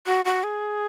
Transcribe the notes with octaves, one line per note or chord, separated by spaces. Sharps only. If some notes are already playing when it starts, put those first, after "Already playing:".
F#4
F#4
G#4